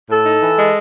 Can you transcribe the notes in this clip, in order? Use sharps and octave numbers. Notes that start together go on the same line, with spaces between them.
A2 A4
D#4
E3
G#3